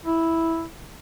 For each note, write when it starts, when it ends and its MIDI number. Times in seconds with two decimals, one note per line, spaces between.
0.05 0.65 64